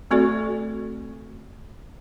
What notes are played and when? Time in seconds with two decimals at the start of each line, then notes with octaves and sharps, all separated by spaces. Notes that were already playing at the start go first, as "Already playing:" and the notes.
0.11 A3 C4 F#4 A4 D5